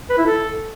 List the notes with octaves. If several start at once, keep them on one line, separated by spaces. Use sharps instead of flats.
B4
E4
A4